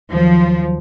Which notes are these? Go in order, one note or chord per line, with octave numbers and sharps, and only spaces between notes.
D#2 D#3 F3 F#3